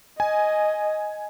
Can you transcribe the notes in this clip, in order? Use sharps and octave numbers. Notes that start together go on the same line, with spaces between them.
D#5 G#5